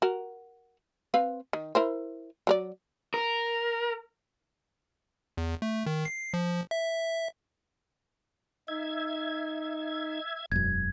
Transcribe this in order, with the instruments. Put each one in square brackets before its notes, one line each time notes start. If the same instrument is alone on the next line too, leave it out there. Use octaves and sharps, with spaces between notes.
[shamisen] F#4 A#4
C4 B4 F5
D#3
E4 A#4 C5
F#3 A#4 D5
[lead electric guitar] A#4
[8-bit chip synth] E2
A3
D#3
C7
F3
E5
[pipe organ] D#4 [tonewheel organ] E5 G#6
[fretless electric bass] E1 F#2 [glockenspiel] G#6